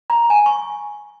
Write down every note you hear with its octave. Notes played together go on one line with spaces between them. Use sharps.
A#5
G#5
C#6